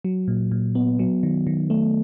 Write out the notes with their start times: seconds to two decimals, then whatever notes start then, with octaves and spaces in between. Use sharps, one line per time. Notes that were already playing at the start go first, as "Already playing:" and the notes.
0.05 F#3
0.28 A#2
0.52 A#2
0.75 B3
0.99 F#3
1.23 D#3
1.47 D#3
1.70 A3